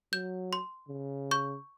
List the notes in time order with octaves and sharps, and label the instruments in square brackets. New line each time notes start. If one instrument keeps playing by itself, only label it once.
[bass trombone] F#3 [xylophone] G6
[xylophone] C6
[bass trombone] C#3
[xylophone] C#6 G6